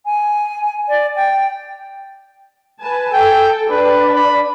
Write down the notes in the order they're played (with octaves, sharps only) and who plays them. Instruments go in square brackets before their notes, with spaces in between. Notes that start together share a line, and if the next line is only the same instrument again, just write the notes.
[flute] G#5
D5
G5
[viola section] B4 G#5 A5
[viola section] A4 [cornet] G5
[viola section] D4 [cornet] B4
[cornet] B5